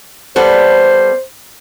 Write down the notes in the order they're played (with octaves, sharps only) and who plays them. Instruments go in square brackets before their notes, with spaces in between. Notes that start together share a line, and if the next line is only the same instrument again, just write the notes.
[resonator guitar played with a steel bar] G3 B3 A4 [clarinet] C5